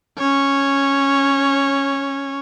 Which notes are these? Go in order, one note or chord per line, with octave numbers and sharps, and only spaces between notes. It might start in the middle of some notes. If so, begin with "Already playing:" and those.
C#4 C#5